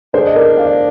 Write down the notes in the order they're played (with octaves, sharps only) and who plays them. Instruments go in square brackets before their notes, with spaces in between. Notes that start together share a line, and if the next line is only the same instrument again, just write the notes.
[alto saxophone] D4 [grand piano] G#4 C5
[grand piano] D#5
A#4 D5
D5 F5